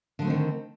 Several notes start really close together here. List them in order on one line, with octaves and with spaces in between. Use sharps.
D3 G#3 A3 C4 D#3